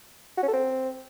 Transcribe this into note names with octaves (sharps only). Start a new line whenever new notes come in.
F#4
C#4
A4
C4